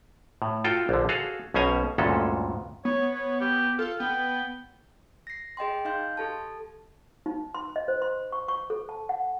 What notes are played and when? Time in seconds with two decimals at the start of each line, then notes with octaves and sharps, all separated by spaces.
0.42 A2
0.64 F4 F#4 A4 G5
0.89 A#1 D3
1.09 F#4 G#4 A4 F5
1.54 B1 B2 C#4 C5 G#5 A#5
1.98 D2 G2 A#2 G#3 C#4 A4
2.85 B3 C#5
3.15 C#5
3.41 G4
3.79 F4 A4
4.00 B3 G5
5.27 A#6 C7
5.57 G#4 D#5 G5 C6
5.85 D#4 D#5 F5 C6 G6
6.17 G4 A4 A5
7.26 D#4
7.54 C6
7.76 D#5
7.88 C5
8.02 C6
8.32 C#6
8.48 C#6
8.70 A4
8.89 A5
9.09 F#5